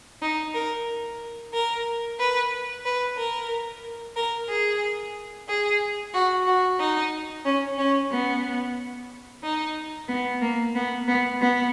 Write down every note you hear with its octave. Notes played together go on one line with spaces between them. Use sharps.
D#4
A#4
A#4
B4
B4
A#4
A#4
G#4
G#4
F#4
F#4
D#4
C#4
C#4
B3
D#4
B3
A#3
B3
B3
B3